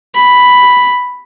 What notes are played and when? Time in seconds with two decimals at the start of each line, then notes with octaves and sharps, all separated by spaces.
0.15 B5